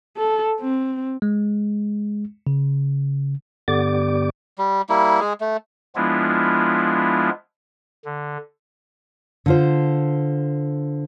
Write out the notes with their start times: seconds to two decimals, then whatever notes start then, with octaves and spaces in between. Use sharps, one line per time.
0.17 A4
0.60 C4
1.22 G#3
2.47 C#3
3.68 G2 D3 B3 G4 D5 D6
4.58 G3
4.89 G3 A#3 E4
5.20 G#3 G#4
5.41 A3
5.96 F3 G#3 B3 D4 E4 F4
8.05 D3
9.46 D3 F4 C5